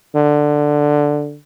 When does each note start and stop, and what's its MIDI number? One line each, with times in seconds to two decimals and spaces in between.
0.15 1.37 50